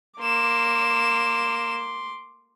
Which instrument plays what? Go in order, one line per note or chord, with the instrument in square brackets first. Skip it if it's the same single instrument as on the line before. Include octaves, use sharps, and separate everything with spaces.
[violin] A#3 E7 [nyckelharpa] C6 D6